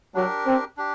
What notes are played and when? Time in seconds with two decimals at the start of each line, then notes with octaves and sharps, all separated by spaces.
0.14 F#3 D4 G4 A#4
0.47 C4
0.77 D4 G4